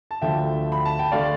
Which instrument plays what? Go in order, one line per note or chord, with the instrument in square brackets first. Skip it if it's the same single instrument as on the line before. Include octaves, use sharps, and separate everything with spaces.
[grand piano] A5
D2 D3 F3 E5 G5
B5
A5
G5
D3 A3 D5 F5